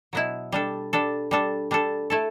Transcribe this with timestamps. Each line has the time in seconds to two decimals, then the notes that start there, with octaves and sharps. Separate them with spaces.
0.13 B2 F#3 B3 E4
0.52 G3 D4 A4
0.93 G3 D4 A4
1.31 G3 D4 A4
1.71 G3 D4 A4
2.10 A3 E4 A4